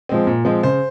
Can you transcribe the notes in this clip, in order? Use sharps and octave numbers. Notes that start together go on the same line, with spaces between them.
F3 G#3 C4
A#2
F3 G#3 C4
C#3 C5